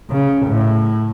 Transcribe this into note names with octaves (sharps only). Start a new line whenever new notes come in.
C#3
A2